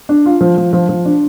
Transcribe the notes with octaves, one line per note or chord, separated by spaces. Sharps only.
D4
F4
F3
F3
F3
F3
D4